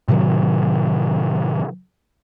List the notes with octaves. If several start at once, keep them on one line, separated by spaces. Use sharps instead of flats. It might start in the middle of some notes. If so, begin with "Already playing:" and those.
A2 C3 D#3 F#3